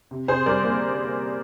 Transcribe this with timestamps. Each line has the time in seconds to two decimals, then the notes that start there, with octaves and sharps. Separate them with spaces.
0.11 C3
0.28 C3 G#4 C5
0.46 G3 A#4 D5
0.64 A#3